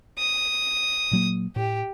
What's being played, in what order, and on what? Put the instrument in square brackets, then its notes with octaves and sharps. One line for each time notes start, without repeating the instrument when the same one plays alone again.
[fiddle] D#6
[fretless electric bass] A#2 F#3 A#3
[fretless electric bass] A2 [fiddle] G4